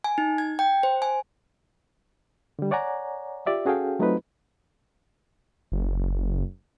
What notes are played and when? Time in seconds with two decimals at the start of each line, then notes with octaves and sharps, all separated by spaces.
0.04 G#5
0.18 D#4
0.38 G#6
0.59 G5
0.83 C5
1.02 G#5
2.59 D3 G3
2.71 C#5 D5 F#5 G#5 A#5
3.46 F4 G4 D5 E5
3.65 C#4 F#4 G#4 A4 F5 G5
3.99 F#3 A3 C4 D#4 F4 B4
5.72 F#1